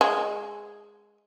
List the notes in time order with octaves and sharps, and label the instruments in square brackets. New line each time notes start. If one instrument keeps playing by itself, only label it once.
[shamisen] G#3